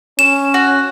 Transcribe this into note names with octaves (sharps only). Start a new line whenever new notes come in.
C#4 E7
F#4